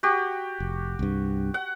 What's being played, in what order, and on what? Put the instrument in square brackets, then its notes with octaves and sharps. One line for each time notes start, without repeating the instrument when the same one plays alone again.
[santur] F#4 G4
[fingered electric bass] F1
C2 G2
[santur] F#5